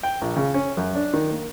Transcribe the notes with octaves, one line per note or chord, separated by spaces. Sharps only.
G5
A#1
C#3
C#4
F#2
D4
D#3
A#3